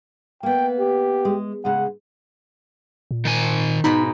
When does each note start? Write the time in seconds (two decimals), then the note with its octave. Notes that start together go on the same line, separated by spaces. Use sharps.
0.43 A#3 B3 G5
0.80 G4
1.25 G#3
1.65 C#3 G#3 F#5
3.11 A#2
3.25 D#3 G#5
3.84 G#2 B2 D#4 B5